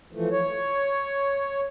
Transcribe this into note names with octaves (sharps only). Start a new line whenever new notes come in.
E3 F3 A3
C#5